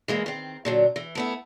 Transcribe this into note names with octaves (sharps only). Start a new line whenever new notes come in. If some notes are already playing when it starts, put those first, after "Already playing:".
E3 G#3 A#3
D#3 C4
A#2 D3 F#3
E3
A3 B3 E4